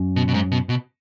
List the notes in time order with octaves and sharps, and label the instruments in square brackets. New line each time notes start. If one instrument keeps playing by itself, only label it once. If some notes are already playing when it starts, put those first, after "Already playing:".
Already playing: [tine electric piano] F#2 F#3 C#4
[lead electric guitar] B2
B2
G#2
B2
B2